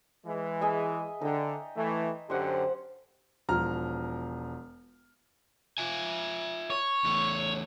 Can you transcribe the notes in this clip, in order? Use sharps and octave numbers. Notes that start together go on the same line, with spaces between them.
E3 G#3
G#4 D#5 E5
D3 G5 A#5
E3 A3
F#2 D3 G4 C5 F#5
E1 F3 A#5 F6
F4 E5 G#5
C#5
E2 A3